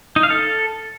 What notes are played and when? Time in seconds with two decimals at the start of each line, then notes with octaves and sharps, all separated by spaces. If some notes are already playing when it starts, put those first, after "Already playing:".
0.16 D#4
0.23 F5
0.30 A4